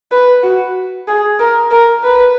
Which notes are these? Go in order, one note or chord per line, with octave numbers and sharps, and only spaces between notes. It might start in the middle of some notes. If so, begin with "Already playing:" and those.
B4
F#4
G#4
A#4
A#4
B4